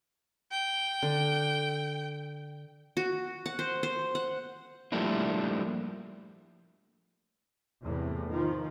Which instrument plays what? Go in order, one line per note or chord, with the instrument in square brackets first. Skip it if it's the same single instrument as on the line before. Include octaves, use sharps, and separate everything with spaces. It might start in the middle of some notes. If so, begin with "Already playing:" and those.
[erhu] G5
[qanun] D3
F#4
F#5
C5
C5
F#5
[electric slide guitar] F3 G3 A3 A#3 D4 E4
[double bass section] E2 A2 C3
D#3 F3